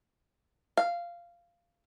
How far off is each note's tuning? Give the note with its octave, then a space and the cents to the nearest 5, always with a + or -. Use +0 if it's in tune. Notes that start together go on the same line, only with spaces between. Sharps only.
F5 -10